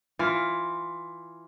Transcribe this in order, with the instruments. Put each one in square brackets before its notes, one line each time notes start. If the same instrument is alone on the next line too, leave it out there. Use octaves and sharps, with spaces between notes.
[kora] E3 F4